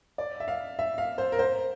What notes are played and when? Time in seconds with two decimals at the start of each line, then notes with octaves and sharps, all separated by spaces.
0.18 D5
0.40 E5
0.48 F5
0.79 E5
0.98 F5
1.18 C5
1.32 A#4
1.39 C5